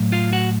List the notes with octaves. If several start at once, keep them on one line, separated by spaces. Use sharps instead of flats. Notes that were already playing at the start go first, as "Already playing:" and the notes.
Already playing: A2 F#3
F4 F5
F#4 F#5